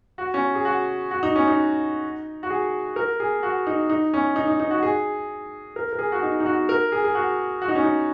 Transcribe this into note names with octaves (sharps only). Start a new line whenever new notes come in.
F#4
C#4
G#4
F#4
F#4
D#4
C#4
D#4
F#4
G#4
A#4
G#4
F#4
D#4
D#4
C#4
D#4
D#4
D#4
F#4
G#4
A#4
A#4
G#4
F#4
D#4
D#4
F#4
A#4
G#4
G#4
F#4
F#4
D#4
C#4
D#4